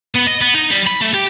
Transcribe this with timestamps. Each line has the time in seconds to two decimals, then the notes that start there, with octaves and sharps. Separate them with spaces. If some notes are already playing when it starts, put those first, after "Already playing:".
0.16 B3
0.27 D#5
0.41 B3
0.55 D#4
0.71 G3
0.87 B5
1.01 A3
1.14 G4